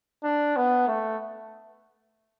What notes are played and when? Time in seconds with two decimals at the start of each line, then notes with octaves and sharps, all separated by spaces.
0.24 D4
0.56 B3
0.88 A3